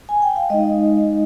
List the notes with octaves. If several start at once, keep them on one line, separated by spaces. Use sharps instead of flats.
G#5
G5
F5
G#3 D#4 D#5